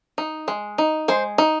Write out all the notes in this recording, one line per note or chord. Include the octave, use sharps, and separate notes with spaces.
D#4
G#3
D#4
G#3 C5
D#4